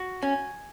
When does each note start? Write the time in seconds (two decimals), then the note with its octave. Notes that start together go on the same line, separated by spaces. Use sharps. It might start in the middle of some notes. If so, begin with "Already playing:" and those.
Already playing: F#4
0.22 C#4 G#5